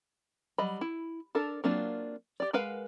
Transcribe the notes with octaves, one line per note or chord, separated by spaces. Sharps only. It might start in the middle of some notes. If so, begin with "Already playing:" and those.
F#3 G3 D#5 B5
E4
D4 A4 A#4
F#3 A#3 C4 D4 F4
G4 D5
G#3 A#4 B4 F5 F#5